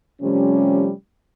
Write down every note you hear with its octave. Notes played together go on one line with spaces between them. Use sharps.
C3 F3 G3 A3 C#4